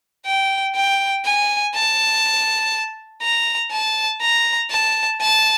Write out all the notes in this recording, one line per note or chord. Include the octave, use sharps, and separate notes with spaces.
G5
G5
G#5
A5
A#5
A5
A#5
A5
A5